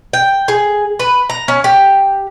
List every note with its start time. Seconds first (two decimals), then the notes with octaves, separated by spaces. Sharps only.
0.13 G5
0.48 G#4
0.99 B4
1.30 A#5
1.48 C#4
1.64 G4